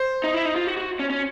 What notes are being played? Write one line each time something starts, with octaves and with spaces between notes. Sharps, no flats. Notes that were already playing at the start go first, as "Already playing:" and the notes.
Already playing: C5
D#4
E4
D#4
F4
F#4
F#4
C#4
C#4